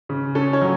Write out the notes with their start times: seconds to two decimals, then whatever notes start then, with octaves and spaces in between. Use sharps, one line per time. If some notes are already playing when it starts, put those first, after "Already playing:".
0.09 C#3
0.35 C#4 A4
0.53 C#5
0.61 F#3